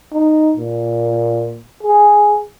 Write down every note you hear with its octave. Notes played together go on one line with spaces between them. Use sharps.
D#4
A#2
G#4